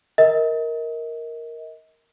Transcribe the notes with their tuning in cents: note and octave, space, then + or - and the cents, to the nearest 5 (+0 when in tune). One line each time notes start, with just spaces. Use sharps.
A#4 +0 D#5 +35